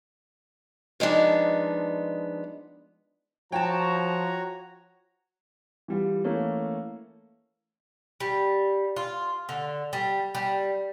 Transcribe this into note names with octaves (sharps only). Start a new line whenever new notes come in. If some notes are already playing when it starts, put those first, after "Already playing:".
F3 G#3 B3 D4 D#4
F3 F#4 C#5 G5 A5 A#5
E3 G3 F4
E3 A3 A#3 C#4
G3
F4
D3
G3
G3